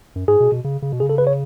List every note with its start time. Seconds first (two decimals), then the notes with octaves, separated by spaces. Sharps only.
0.16 F#2
0.28 G#2 G#4
0.40 B2
0.52 B2
0.64 C#3
0.82 C#3
0.92 B2
1.00 C#3 G#4
1.09 A4
1.18 B4
1.27 C#5